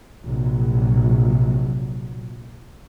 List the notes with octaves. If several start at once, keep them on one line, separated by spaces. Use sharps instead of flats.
A#1 C3 F#3